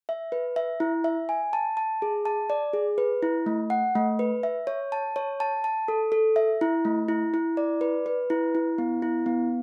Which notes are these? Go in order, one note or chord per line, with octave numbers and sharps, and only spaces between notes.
E5
B4
E5
E4
E5
G#5
A5
A5
G#4
A5
D5
G#4
B4
E4
A3
F#5
A3
B4
E5
C#5
A5
C#5
A5
A5
A4
A4
E5
E4
A3
E4
E4
D5
B4
B4
E4
E4
B3
E4
B3